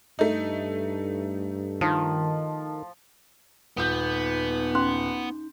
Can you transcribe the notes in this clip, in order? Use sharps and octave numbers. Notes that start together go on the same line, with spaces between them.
G2 A3 D#4
D#3 F3
D#1 B3 D#4 G6
C#4 C6